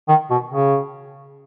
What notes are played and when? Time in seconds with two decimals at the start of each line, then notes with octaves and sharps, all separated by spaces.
0.08 D#3
0.31 B2
0.52 C#3